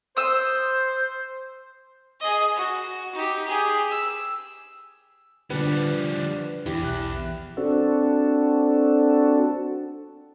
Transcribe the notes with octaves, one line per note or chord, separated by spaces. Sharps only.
C5 D#6 E6
G#4 D#5
F#4
D#4 G4
G4 G#4
E6
D3 F3 G3 D4 B4 F#5 F#6
E2 E4 G4
B1 F#6
C4 D4 F#4 A4